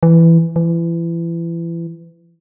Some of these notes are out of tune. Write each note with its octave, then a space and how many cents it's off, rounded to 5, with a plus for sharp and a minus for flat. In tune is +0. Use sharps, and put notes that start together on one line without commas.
E3 +10
E3 +30